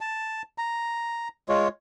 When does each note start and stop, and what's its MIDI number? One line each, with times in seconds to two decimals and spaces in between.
0.01 0.42 81
0.58 1.28 82
1.49 1.68 56
1.49 1.68 65
1.49 1.68 73